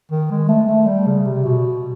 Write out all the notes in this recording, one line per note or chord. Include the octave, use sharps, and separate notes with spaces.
D#3
G#3
A3
A3
G3
C#3
C3
B2